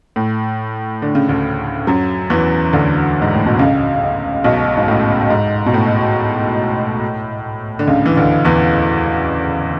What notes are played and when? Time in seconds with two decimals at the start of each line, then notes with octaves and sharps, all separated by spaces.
0.16 A2
1.02 D3
1.15 C#3
1.29 D2 D3
1.87 F#2 F#3
2.30 E2 E3
2.73 D2 D3
3.22 G#2
3.34 A2
3.46 B2
3.59 C#2 C#3
4.44 B1 B2
4.77 G#2
4.88 A2
5.30 G#2
5.66 B2
5.74 A2
7.79 D3
7.87 C#2 C#3
8.06 E3
8.16 D2 D3
8.45 E2 E3